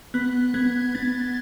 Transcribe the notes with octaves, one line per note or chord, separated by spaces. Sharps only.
B3 F#6
B3 G#6
B3 A6